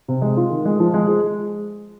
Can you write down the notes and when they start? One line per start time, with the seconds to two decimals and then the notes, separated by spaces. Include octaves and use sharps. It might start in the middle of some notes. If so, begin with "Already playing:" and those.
0.08 C3
0.22 G#3
0.37 F4
0.51 D#3
0.65 G#3
0.80 F3
0.94 G#3
1.08 G#4